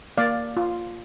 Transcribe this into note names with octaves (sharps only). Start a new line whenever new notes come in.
A#3 D5 F5
F4